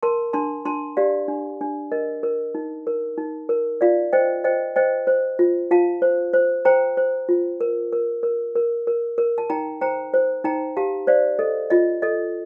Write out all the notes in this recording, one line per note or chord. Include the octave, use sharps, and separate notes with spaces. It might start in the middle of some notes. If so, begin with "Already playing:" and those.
A#4 A5 C6
D4 A5 C6
D4 A5 C6
G4 D5 F5
D4
D4
A#4 D#5
A#4
D#4
A#4
D#4
A#4
F4 D5 F5
C5 D#5 G5
C5 D#5 G5
C5 D#5 G5
C5
F4
F4 F5 A5
C5
C5
C5 G5 A#5
C5
F4
A#4
A#4
A#4
A#4
A#4
A#4
A5
D#4 G5 A#5
C5 G5 A#5
C5
D#4 G5 A#5
G4 F5 A5
C5 D5 F5
A4 D#5
F4 D#5
A4 D#5